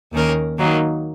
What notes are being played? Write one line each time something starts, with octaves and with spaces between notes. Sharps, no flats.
D#2 D#3 A#3 C#4 A#4
D#3 F#3 A#3 D#4